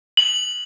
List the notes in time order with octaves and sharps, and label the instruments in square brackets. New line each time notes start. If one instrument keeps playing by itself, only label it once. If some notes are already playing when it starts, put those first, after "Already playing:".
[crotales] F#7